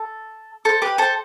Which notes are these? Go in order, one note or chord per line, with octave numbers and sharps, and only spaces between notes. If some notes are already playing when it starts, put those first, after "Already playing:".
Already playing: A4
A4 C5
G4 B4
A4 C5